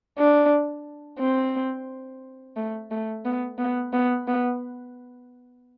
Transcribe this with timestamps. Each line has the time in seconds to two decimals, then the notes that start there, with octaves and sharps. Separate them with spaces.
0.18 D4
1.20 C4
2.56 A3
2.91 A3
3.25 B3
3.58 B3
3.93 B3
4.28 B3